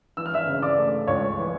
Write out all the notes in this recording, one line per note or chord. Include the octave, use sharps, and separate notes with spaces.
E3 E6
F6
E5 E6
C#3
D5 D6
A3
C#2 C#5 C#6
E3